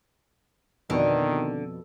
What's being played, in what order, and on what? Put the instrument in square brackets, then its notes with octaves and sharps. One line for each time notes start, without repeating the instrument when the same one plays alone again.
[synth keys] F2 B2 [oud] D3 [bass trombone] D#3